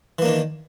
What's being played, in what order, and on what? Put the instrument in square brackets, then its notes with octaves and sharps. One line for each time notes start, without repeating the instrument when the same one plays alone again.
[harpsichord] E3
A#3
D4
D#3